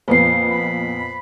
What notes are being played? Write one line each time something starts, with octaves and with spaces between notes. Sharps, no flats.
F2 A#2 B3 C5 C7
B5